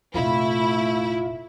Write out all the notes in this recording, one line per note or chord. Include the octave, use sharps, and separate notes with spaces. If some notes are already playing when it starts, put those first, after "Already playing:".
F1 A#2 A3 E4 F4